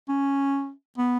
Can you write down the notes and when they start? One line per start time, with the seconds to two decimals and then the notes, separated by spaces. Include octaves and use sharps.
0.09 C#4
0.98 B3